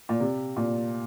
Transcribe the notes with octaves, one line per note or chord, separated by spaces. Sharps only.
A#2
C3
A#2